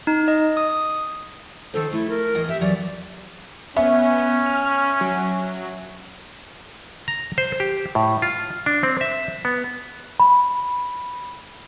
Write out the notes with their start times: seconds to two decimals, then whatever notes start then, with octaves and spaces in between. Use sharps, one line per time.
0.07 D#4
0.28 D#5
0.57 D#6
1.74 D#3 D#4 A4 C5
1.93 A3 E4
2.09 A#4
2.35 E2 A2 D#5
2.49 G4 E5
2.61 E2 F#3 D5
3.77 B3 C#4 E5
4.46 F6
5.01 F#3
7.08 A#5
7.38 C5
7.60 G4
7.95 A2
8.22 F4
8.66 D4
8.83 C4
9.01 E5
9.45 B3
10.20 B5